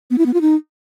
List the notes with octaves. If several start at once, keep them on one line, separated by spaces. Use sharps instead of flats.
B3
E4
B3
F4
D#4